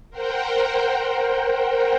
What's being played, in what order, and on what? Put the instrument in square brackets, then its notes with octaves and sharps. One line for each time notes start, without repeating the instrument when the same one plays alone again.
[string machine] A#4 C5 F#5 G5